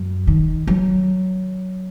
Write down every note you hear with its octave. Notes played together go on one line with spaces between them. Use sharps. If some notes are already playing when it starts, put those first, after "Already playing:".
Already playing: F#2
D#3
F#3